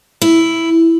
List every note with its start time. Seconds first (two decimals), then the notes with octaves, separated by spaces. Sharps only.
0.22 E4